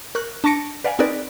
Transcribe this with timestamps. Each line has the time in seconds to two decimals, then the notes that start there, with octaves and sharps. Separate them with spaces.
0.15 A#4 C#6 F#6
0.44 D4 A5 C#6 A#6 C#7 D7
0.84 B4 D5 F5 F#5 G#5
0.99 C4 D#4 G#4 A#4 B4 D5